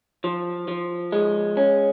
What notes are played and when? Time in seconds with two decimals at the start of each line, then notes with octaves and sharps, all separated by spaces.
0.24 F3
0.68 F3
1.12 G#3
1.57 C#4